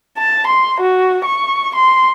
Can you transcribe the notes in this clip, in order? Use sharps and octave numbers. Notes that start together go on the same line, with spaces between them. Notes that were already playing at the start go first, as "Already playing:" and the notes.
A5
C6
F#4
C#6
C6